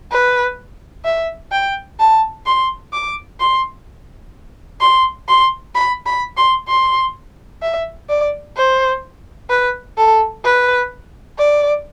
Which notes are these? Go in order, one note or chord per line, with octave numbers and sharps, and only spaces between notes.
B4
E5
G5
A5
C6
D6
C6
C6
C6
B5
B5
C6
C6
E5
D5
C5
B4
A4
B4
D5